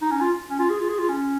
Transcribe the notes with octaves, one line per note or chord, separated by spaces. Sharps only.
D#4
C#4
F4
C#4
F4
G#4
F4
G#4
F4
C#4